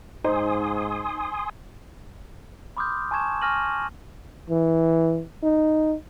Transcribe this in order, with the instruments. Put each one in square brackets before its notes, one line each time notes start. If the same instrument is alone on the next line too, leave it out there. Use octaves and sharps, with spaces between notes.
[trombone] G#2 [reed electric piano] D#4 [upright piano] C5 [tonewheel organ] G#5 C6 D#6
[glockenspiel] B5 C6 D6 D#6 F6 G6
G#5 A5 C#6 G#6 E7
G#5 C#6 F6 A#6 D#7 F#7
[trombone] E3
D#4